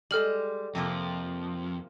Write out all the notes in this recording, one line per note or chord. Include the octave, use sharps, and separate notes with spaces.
G3 G#3 A4 F6 F#7
F2 C3 F3 A#3